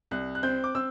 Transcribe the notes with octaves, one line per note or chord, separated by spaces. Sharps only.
C2 F#6
F#6
C4 G6
D6
C4 E6